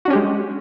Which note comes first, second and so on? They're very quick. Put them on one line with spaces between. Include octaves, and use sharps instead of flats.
F#4 D4 C#4 G4 G#3